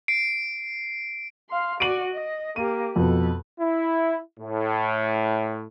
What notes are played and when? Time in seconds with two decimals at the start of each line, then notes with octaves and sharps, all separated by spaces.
0.08 C7 D7
1.49 F5 C6
1.80 F#4 D5 D7 D#7 F#7
2.13 D#5
2.56 A#3 G4 D#7
2.96 F2 B2 A4 B4
3.60 E4
4.40 A2